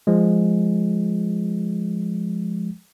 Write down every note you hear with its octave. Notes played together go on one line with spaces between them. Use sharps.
F3 G#3